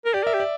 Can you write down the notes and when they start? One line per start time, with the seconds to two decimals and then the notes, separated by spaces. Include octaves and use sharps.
0.05 A#4
0.14 G4 D5
0.24 A#4 E5
0.34 G4
0.40 D5